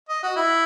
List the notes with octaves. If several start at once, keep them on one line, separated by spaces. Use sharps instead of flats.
D#5
F#4
E4